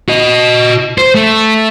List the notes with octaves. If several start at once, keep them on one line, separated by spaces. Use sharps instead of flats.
F#4 D#5
C5
A3